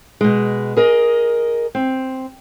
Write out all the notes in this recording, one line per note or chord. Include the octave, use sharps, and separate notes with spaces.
B2 G#3
G#4 A#4 D#5
C4